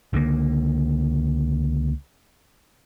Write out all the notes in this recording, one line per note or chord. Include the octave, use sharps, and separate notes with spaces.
C#2 D3 G3 A#3